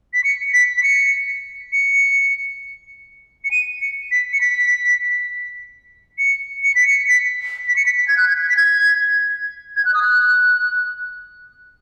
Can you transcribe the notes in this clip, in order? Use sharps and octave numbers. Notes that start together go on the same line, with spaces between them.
B6
C#7
B6
B6
C#7
C#7
C#7
D#7
C#7
B6
C#7
B6
C#7
C#7
B6
C#7
B6
B6
C#7
B6
B6
G#6
F#6
G#6
G#6
B6
G#6
G#6
F#6
D#6
F#6